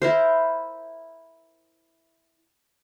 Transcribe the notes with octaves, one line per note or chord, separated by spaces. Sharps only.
E4 A#4 C5